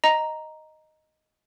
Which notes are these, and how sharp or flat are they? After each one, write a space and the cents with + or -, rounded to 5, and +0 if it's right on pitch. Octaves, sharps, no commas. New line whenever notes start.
D#5 +0 A#5 +0